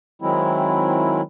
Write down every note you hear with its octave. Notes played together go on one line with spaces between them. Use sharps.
D#3 F#3 G#3 C4 E4